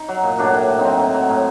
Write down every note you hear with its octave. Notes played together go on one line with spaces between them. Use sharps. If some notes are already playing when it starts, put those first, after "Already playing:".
Already playing: D#4
F#3
A#2
A2 D4 F#4
A2
A2
C4 D#4
F#3
A2
F#3
A2